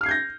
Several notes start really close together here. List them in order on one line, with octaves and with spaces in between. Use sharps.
F6 C7 G#6 G6 A#6